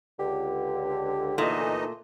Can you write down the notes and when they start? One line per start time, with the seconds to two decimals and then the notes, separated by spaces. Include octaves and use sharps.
0.19 C#2 D3 G4
1.38 A#2 E3 A3 D#4 D#5